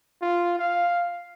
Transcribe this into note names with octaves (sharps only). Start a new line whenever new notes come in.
F4
F5